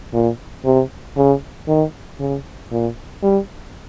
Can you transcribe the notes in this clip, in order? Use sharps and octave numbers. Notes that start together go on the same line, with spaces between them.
A#2
C3
C#3
D#3
C#3
A#2
G3